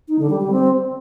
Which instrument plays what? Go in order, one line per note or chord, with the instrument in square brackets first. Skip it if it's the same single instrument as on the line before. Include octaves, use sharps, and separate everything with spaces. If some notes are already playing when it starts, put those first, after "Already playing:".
[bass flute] D#4
D3
G3
G3
C4